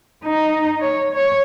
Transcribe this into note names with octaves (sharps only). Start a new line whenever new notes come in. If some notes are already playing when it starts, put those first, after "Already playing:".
D#4
C#5
C#5